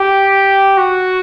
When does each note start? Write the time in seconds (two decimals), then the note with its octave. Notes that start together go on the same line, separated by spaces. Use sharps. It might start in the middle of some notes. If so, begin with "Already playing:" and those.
Already playing: G4
0.77 F#4